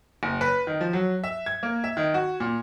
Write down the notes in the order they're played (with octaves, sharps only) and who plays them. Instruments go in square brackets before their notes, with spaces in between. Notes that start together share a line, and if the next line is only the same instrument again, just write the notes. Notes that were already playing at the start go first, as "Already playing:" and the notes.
[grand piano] F#1
B4
D#3
F3
F#3
E5
G#6
A#3
E5
D#3
F#4
A#2